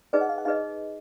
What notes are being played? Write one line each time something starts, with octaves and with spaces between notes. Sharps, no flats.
D#4 G#4 B4 D5 D#5
F#5
F5
F#5
D#4 G#4 B4 D#5 F5